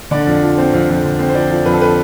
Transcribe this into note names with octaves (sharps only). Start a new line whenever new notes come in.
D3 D5
F2
F3
C4
F2
F2
D3
C4
C5
F3 D5
F3
F2 B4
A4
B4